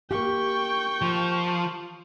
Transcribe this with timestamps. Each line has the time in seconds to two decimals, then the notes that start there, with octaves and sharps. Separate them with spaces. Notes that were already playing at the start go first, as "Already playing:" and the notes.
0.11 A#3 G4 G5 C#6
1.01 F3